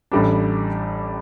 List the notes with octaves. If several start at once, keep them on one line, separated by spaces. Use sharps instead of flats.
A1 A2 G3 D4